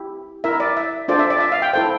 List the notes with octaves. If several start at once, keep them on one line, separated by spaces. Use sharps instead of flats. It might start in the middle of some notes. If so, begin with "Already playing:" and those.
Already playing: E4 G4
E4 A#4 E5
D5
E5
D4 F4 A4 C5 D5
E5
D5
E5
F5
G5
E4 A4 C5 G5